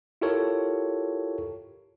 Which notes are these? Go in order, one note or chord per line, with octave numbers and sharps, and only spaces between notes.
E4 F4 G4 A4 A#4 C#5